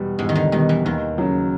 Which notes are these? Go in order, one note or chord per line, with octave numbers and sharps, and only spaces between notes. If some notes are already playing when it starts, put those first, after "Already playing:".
Already playing: E2 B2 G3 B3
E2 G#2
D#3
D3
B2 D#3 G3 B3
E3
D#2 D#3
C#3 F#3